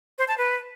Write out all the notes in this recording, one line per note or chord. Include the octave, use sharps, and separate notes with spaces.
C5
A5
B4